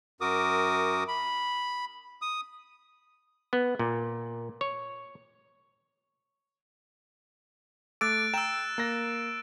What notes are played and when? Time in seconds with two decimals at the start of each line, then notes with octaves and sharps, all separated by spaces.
0.21 F#2 F#4 A#4 D6 D#6
1.08 B5
2.22 D#6
3.53 B3
3.79 A#2
4.61 C#5
8.01 A3 D6 E6 F#6 A6 D7
8.34 G5 A#5 E6 E7
8.78 A#3 A#6